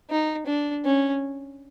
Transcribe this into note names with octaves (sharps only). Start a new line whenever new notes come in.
D#4
D4
C#4